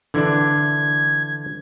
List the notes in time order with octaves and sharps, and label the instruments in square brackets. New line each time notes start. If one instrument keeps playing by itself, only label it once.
[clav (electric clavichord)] D3 E3 D4 [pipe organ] G#6